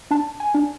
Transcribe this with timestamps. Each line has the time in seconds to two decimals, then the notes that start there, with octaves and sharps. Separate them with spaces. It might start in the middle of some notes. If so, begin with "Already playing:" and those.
0.11 D4 A5
0.40 G#5
0.54 D4